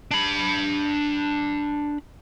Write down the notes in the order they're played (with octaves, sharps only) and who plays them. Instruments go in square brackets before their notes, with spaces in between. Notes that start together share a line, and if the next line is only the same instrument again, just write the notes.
[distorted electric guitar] D4 B5